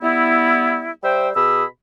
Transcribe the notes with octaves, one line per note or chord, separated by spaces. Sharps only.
G3 B3 E4
G3 C5 E5 G5
B2 G#4 B5 E6